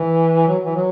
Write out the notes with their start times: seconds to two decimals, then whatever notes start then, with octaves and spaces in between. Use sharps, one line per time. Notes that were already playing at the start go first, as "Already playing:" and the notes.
Already playing: E3
0.48 F#3
0.66 E3
0.75 F#3